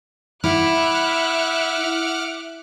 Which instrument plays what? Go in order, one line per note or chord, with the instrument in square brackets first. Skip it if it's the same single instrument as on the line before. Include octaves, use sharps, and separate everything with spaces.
[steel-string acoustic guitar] E4 [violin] E5 F#6 [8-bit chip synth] F#5 D6 F6